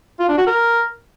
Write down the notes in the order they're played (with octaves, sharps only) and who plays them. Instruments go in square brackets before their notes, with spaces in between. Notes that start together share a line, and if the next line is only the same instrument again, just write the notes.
[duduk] F4
D4
F#4
A#4